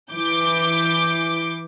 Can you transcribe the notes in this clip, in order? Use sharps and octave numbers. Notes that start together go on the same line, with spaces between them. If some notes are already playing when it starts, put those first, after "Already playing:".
E3 D6 G6